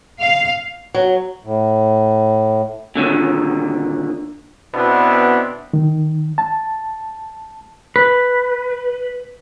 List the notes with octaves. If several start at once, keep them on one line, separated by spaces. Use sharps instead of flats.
F5
F#3
A2
A#2 D3 D#3
B2 B3 C4 D4 E4
D#3
A5
B4